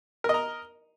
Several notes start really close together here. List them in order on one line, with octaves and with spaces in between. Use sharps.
A#4 D#5 A#5